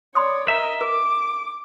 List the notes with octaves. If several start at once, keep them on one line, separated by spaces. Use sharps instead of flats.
C#5 D5 B5 C6 D#6
A#4 D#5 E5
A#4 D6